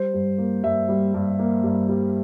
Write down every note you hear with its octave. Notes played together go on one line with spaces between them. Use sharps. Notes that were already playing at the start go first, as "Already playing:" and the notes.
Already playing: G3 C5
G2
A#3
G2 E5
G3
G2
A#3
G2
G3